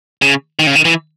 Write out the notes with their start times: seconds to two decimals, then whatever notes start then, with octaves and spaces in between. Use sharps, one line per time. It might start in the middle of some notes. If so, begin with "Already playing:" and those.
0.22 C#3
0.59 D#3
0.67 C#3
0.76 D#3
0.85 E3